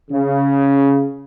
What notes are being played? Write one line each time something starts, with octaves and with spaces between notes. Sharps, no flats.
C#3